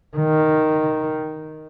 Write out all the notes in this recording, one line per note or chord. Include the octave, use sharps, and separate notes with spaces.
D#3